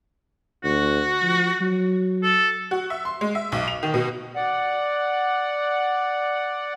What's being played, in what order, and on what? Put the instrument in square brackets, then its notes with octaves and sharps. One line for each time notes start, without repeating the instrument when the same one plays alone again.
[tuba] D2 [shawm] F#4
[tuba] F3
F#3
[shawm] A4
[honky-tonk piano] F#4
E5
C6
G#3
E5
B1
F7
D#3
B2
[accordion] D5 F#5